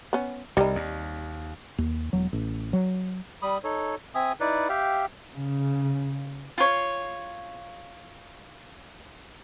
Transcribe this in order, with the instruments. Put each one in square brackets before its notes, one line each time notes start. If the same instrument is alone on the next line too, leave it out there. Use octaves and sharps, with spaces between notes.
[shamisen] B3 C#4
[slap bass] C2 [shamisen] G3 C4 D#4
[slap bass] D#2
[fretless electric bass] D#2
E1 F#3
A1
F#3
[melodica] G3 B5 D#6
D#4 A4 C#5
C4 E5 G#5 D#6
D#4 E4 B4 D5
G4 E5 F5 G5
[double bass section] C#3
[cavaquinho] F4 C#5